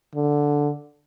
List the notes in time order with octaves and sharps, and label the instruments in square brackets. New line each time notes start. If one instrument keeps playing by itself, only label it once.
[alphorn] D3